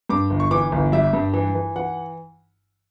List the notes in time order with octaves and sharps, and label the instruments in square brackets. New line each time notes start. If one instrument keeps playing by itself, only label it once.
[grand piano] G2 D6
G1
C#6
E3 D6
G1
G3 E5
G2
E3
E3
E3 F#5